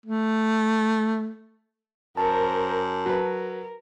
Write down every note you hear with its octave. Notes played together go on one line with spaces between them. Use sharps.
A3
F#2 A#4 C5 A5
F#3 A#4 B4